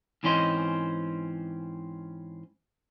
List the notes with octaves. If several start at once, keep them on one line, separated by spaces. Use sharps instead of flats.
G#2 E3 C4 C#4 C5 D#5